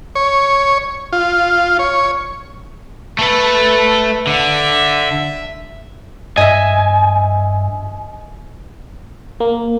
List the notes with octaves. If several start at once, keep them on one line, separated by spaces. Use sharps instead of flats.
C#5
F4
C#5
A3 A4 B4
D3 E5
G2 D#5 E5 G#5
A#3